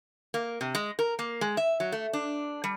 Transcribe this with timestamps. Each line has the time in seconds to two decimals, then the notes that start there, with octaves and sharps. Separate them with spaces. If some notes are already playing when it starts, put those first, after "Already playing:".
0.34 A#3
0.61 C3
0.75 G#3
0.99 A#4
1.19 A#3
1.41 G#3
1.57 E5
1.80 F#3
1.92 A3
2.13 D4
2.64 G3